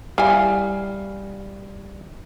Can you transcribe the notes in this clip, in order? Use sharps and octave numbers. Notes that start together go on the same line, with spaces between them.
G3 E4 F5 G#5